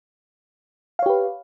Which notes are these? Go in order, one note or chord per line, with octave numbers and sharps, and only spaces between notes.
G4 B4 C#5 F5